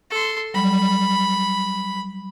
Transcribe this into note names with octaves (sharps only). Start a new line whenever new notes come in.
A4 C6
F#3 G3 B5